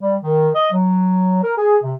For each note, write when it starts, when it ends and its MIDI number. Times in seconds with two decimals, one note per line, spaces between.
0.01 0.16 55
0.21 0.49 51
0.55 0.71 75
0.72 1.40 54
1.43 1.52 70
1.57 1.77 68
1.82 1.93 48